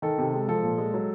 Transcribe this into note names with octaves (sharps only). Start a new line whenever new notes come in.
D#3 A4
C3
G#3
F3 A4
A#2
G#3
F#3